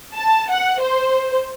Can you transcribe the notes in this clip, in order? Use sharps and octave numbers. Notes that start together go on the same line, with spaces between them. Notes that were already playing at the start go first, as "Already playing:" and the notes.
A5
F#5
C5